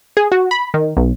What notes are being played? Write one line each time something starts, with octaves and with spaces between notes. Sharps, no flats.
G#4
F#4
B5
D#3
B1